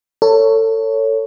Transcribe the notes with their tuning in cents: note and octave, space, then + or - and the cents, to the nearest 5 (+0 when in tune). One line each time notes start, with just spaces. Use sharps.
A4 +30 C#5 +5